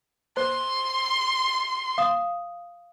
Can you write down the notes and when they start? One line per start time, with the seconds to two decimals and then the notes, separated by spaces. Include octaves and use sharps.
0.37 C5 C6
1.98 F5 D#6